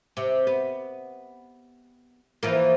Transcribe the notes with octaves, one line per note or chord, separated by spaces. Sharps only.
C3
B3
E3 F3 A#3